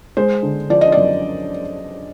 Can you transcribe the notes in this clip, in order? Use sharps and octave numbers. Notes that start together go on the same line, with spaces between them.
G#3 C5
D3
F3 D5
D#5
F#2 D5